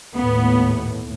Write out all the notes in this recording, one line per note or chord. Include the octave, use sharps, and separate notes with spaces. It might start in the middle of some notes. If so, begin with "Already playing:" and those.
D#2 A2 B3